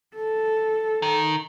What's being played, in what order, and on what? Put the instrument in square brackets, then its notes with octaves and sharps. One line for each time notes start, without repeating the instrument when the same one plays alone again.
[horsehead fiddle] A4
[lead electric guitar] D#3